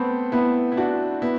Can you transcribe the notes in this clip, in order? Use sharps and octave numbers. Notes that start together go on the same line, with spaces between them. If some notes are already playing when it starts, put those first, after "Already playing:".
Already playing: A3 B3 C4
B3 E4
E4
D4 F#4
B3 E4